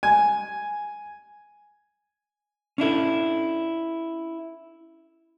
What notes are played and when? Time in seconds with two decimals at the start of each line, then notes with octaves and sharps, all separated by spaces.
0.03 G#5
2.78 C#4 D4 E4 A4